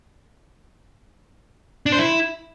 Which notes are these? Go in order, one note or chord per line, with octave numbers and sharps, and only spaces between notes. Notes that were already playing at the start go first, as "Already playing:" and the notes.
D4
C5
E4